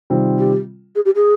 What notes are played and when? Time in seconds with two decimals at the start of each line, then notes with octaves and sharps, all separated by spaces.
0.10 C3 D#3 G3 C4 F4
0.38 G4
0.95 G#4
1.05 G4
1.15 G#4